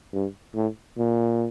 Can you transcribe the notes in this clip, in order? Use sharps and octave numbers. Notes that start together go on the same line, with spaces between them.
G2
A2
A#2